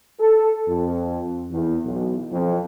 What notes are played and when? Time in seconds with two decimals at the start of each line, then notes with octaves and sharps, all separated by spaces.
0.20 A4
0.67 F2
1.51 E2
1.85 B1
2.31 F2